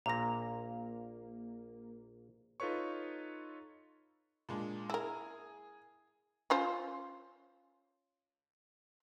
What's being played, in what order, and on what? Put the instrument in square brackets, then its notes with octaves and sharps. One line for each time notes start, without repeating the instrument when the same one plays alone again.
[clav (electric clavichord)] A#1 A#2 [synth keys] A#3 [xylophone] A#5 A#6
[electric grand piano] D#4 F4 A4 B4 C#5 C#6
[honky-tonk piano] A#2 G#3 D4
[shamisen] E4 A#4 [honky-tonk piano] G#4
[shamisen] C#4 F4 C5